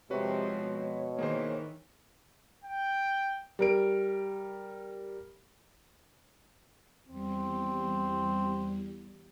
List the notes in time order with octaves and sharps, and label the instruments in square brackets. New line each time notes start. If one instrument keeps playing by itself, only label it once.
[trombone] C3 [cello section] F3 G#3 C4 [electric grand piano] F#4 B4 [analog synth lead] C#5
[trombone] B2
[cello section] D#3 E3 [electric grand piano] A#3 G#4 C5
[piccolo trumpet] G5
[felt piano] G3 A#4 D7
[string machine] E2 G3 [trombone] C4